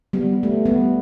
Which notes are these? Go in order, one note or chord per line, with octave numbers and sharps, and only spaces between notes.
G3 B3
A3
G3 B3